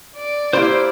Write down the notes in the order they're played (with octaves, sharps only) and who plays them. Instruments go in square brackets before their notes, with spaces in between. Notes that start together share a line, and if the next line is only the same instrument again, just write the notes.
[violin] D5
[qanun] A#3 E4 G4 [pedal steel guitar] C5 C6